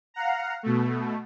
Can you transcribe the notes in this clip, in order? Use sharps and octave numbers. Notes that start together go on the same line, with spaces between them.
F5 F#5 A#5
B2 A3